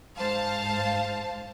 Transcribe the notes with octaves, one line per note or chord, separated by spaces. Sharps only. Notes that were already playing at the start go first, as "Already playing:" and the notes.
G#2 C5 F5 A5